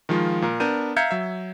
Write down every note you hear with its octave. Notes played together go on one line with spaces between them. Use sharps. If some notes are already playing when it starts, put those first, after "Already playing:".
D#3 F3 G#3 F4
A#2 A#4
B3 D4 A#4 G6 D#7
E5 F5 A#5 G6 G#6 C#7
F#3 E5